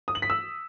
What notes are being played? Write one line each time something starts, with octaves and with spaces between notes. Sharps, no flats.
D#6
F#7
B6
E6